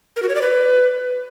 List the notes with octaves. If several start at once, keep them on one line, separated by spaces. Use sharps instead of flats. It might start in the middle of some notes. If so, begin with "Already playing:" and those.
A#4
F#4
C#5
D5
B4